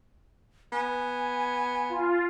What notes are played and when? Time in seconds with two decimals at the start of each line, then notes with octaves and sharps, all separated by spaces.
0.73 B3 G#5
1.89 F4